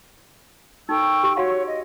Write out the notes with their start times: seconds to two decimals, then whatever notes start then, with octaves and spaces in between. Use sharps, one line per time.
0.89 D#4 A4 G5 C#6 E6
1.23 G4
1.37 F#4 C#5 F5 F#5
1.66 D#5